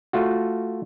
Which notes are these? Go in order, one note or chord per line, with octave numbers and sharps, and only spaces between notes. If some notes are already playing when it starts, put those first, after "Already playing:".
A3 F4 F#4